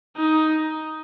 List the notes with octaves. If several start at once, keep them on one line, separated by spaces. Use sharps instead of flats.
D#4